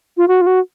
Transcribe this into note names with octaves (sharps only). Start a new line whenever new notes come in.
F4
F#4
F4
F#4